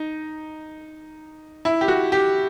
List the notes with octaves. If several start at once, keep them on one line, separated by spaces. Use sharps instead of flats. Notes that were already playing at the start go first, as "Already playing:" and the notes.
Already playing: D#4
E4
G4
F#4
G4